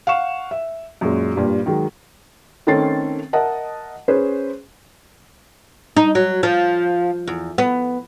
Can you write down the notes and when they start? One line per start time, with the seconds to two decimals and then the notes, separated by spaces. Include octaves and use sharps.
0.07 F5 F#5 C#6 E7
0.51 E5
1.01 F#2 A#2 G#3
1.35 G2 A#2 G3
1.66 D#3 F#3 G#3
2.67 D#3 A3 C4 C#4 A6 C7
3.33 A#4 D#5 E5 F#5 A5
4.08 C#4 G#4 B4 C5
5.97 D#4
6.15 F#3
6.43 F3
7.28 E2
7.58 B3